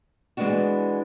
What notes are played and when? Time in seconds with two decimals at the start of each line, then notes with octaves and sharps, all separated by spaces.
0.37 E3 G#3 A#3 B3 D4 F#4